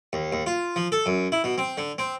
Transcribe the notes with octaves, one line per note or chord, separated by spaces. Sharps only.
D#2
D#2
F4
F3
A4
F#2
E4
B2
C4
D3
C4